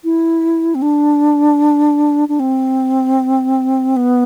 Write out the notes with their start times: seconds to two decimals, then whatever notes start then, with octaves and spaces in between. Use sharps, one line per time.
0.04 E4
0.75 C4
0.82 D4
2.29 D4
2.40 C4
3.96 B3